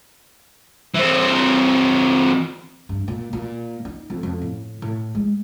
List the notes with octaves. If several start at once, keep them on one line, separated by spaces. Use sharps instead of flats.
E3 C4
G2
A#2
A#2
D#4
F2
F2
A2
A2
G#3